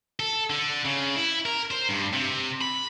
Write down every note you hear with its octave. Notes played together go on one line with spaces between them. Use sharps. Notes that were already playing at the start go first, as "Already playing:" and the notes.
A4
D3
C#3
E4
A#4
C5
G2
C3
B5